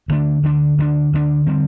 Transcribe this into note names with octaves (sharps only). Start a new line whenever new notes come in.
D2 D3 A3 D4
D2 D3 A3 D4
D2 D3 A3 D4
D2 D3 A3 D4
D3 G3 C4